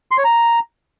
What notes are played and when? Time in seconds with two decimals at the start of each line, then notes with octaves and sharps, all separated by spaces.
0.11 C6
0.18 C#5
0.24 A#5